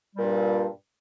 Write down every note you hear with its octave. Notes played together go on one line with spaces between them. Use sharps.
G2 A#2 G3